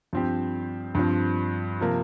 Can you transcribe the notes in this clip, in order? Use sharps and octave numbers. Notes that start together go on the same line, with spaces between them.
G2 F3 C4 G4
G2 F3 C4
C3 F3 A#3